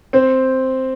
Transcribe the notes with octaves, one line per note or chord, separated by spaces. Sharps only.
C4 C5